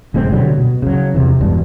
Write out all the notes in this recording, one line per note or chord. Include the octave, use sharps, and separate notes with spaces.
F#1 A2 G#3 C4
B2 D3 F#3 G3
B2
C#3 F#3
E2 C3 E3
E1 G2 B2 D4